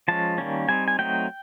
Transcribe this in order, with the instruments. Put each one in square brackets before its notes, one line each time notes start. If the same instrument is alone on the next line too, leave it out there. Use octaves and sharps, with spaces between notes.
[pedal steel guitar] F3 G#3 C#4 A5
D#3 G3 A#3 C#4
G3 C4 D#4 G#5
G#5
F#3 A3 C4 D#4 G5